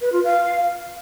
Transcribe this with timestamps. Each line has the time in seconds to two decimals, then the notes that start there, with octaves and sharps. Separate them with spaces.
0.01 B4
0.12 F4
0.24 F5